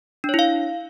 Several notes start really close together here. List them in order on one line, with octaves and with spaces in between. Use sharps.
D4 C#5 E4 F5